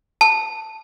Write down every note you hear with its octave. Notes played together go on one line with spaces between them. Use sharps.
A5